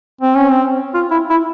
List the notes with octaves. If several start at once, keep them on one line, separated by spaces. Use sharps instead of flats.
C4
C#4
C4
F4
E4
E4